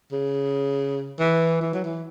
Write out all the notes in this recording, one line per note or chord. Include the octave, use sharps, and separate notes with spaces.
C#3
E3
E3
F#3
E3